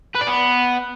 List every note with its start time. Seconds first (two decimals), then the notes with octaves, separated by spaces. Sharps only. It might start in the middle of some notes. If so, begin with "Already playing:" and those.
0.15 B4
0.21 D5
0.27 B3